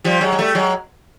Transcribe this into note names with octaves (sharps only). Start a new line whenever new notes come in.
F3 G3
F#3 G#3
G#3
G3 A3
F#3 G#3